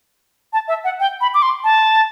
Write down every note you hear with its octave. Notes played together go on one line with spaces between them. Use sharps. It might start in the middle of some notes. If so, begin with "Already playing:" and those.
A5
E5
F#5
G5
B5
D6
C6
A5